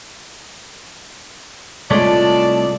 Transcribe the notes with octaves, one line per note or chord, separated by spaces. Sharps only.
C2 G#3 A3 F4 C#5 D5 A5